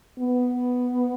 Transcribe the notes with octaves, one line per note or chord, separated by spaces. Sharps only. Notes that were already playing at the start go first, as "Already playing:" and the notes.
B3